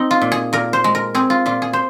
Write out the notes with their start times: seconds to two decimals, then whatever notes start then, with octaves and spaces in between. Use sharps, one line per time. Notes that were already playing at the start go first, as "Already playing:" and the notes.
Already playing: C4 D#4
0.11 F4
0.21 A#2
0.32 G#4
0.53 A#2 A#4
0.73 C5
0.84 G#3
0.95 A#4
1.15 C4 G#4
1.30 F4
1.46 A#2 F4
1.62 G#4
1.73 C5